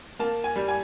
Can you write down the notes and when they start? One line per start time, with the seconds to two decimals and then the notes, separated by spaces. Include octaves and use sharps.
0.19 A#3 A5
0.44 G#5
0.56 G3
0.68 G#5